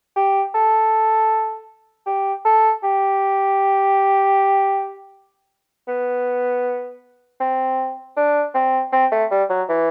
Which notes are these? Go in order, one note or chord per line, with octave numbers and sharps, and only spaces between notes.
G4
A4
G4
A4
G4
B3
C4
D4
C4
C4
A3
G3
F#3
E3